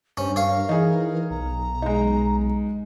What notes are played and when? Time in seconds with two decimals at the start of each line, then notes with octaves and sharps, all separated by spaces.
0.17 G2 C#4 C5
0.36 A#4 C#5 F5
0.69 E3 D#4 G#4
1.31 B1 A#5
1.82 G#3 D#4